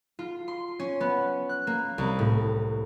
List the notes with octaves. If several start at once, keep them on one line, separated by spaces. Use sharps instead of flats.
F4
C6
C#4
B3
F#6
A#3
C2
A2